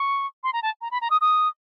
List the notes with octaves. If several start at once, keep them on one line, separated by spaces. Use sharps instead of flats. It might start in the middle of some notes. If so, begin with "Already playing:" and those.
Already playing: C#6
C6
A#5
A5
A#5
B5
A#5
D#6
D#6